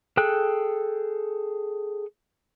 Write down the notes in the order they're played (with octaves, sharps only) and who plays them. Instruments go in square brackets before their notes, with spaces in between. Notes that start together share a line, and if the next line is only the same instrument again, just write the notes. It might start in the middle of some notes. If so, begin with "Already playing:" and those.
[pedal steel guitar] G#4 A4 G5 F#6